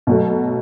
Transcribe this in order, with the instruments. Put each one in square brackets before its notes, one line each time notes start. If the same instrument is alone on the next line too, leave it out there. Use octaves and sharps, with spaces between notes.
[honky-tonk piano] B2 F#3 A3